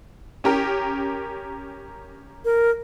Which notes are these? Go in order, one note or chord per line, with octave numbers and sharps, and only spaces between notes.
C#4 G4 A#4
A#4